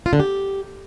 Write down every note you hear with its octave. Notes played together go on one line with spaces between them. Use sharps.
F4
D3
G4